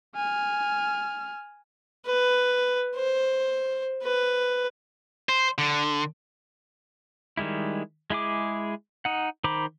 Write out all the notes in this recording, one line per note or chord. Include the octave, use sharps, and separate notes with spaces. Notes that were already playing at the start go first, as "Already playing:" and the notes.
G#5 F6
B4
C5
B4
C5
D3
D#3 G3 G#3 E4
G#3 E4 G#4 D6
D#4 F#5
D#3 C5 A#5 B5 D6